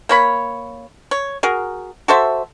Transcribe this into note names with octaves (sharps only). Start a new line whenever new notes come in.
A#3 C#5 B5
C#5
F#4 G#4 A#4
F#4 A4 C5 E5